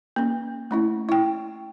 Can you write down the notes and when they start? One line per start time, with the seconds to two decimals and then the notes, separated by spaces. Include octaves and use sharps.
0.16 A#3 C#4
0.71 A3 C#4 E4
1.09 E4 G5